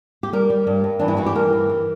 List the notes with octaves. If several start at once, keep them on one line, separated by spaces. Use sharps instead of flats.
G4
G3 A#4
G3
G2
G2
E3 D4
E4
E3 F#4
G4
G2 A#4
E3
E3